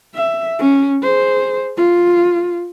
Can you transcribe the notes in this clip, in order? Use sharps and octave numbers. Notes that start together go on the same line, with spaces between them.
E5
C#4
G#4 C5
F4